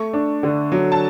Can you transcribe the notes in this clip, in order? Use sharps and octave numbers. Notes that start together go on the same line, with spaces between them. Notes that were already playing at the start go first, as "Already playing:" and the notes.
Already playing: A3 C#6
D4
D3
F#3
A5